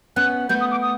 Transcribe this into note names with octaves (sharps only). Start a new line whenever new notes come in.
B3 C#4 F#6
A3 B3 G6
D#6
D6
D#6